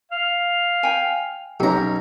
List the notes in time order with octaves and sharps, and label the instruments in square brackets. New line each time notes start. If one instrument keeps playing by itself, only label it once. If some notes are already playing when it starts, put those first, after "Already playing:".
[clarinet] F5
[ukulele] G5 G#5
[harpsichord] B1 A#5 [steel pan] C#4 G4